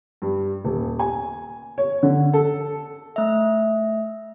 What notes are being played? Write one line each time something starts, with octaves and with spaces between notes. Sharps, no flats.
G2
D#1
G#5
C#5
D3
A4
A3 E5